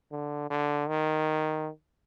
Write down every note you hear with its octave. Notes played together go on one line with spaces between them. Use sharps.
D3
D3
D#3